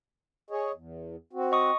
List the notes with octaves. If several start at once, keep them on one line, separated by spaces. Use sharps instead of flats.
G#4 C#5 D#5
E2
C4 F#4
D#5 C#6 D#6